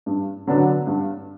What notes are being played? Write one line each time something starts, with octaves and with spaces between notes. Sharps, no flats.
G2
D3 F#3 B3 D4
G2